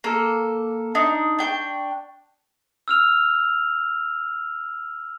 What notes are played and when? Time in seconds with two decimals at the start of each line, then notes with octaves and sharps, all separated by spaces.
0.04 A#3 A4
0.95 D4 D#4
1.39 D4 G5 C#6
2.88 E6 F6 F7